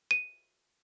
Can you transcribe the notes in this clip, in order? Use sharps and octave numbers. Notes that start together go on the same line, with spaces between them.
D#7